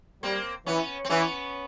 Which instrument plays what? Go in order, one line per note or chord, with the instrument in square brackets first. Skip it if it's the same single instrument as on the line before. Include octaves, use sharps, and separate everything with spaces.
[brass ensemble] G3 [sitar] A#3 C4
[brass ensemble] E3 [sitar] B3 C#4
[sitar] C4
[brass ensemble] E3 [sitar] B3 C#4